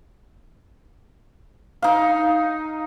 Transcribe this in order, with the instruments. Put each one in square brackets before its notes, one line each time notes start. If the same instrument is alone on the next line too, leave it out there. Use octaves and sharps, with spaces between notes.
[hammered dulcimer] D#4 F5